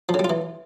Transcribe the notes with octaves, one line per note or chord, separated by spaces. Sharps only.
F3
C#3
G3
F4
E3